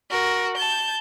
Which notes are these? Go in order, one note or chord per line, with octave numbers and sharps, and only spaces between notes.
F#4 A#4
A5 G6